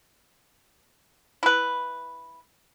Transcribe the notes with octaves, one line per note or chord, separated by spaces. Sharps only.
E4 B4